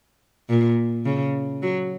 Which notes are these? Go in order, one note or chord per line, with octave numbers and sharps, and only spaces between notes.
A#2
C#3
F#3